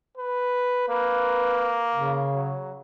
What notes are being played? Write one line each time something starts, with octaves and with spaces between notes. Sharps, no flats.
B4
A#3 B4
C#3
F#3